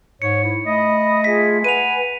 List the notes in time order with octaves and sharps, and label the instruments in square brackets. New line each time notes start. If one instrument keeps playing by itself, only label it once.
[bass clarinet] G#2 [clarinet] C#5 [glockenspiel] C#7
[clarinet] E4
[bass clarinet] A3 [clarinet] D#5 [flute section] B5 D#6
[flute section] F4 G#4 E5 [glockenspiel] B6
[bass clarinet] B4 [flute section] F#5 G#5 [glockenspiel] D#7 F7